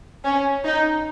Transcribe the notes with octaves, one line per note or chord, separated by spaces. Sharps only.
C#4
D#4